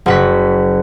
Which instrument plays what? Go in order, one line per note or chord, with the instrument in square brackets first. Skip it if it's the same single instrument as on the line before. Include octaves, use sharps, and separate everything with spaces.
[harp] F#1 F#4 B6